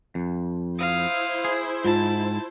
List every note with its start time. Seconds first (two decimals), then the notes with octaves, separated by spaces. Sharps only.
0.15 F2
0.79 E4 C5 F5 D#6
1.45 G#4
1.85 G#2 F4 A5